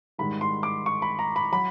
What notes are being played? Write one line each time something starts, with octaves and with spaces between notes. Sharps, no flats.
G#2 D#3 G3 B5
C6
D6
C#6
B5
A#5
B5
F#3 B5